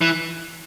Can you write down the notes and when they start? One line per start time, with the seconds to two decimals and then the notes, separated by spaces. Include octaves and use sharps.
0.01 E3